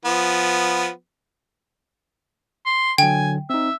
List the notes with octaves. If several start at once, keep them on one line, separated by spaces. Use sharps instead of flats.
F3 B3
C6
D3 F#3 G5 G#5
C4 D#4 E5